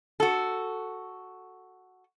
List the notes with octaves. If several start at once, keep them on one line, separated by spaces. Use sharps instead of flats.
F#4 A4